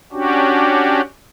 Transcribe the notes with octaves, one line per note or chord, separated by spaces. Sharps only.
C#4 D4 F#4 G4